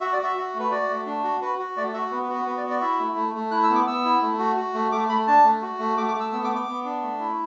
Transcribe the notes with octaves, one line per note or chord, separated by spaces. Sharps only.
F#4 E5
D5
F#4
E5
F#4
A3
B4
F#4 D5
A3
D4
F#4
F#4 B4
F#4
A3 D5
F#4 E5
B3 B4
B4
F#4
B4
B3 B4
D5
F#4
D5
E4 E5
A3
A3
A3
E4 F#6
E6
B3
D6
B3 E6
E4
A3
F#4
F#4
A3
A3 D6
A3 B5
D4 A5
A3
F#4
A3
A3 D6
D6
A3
E6
B3 E6
D6
B3
D6
B3
D4
A3
E4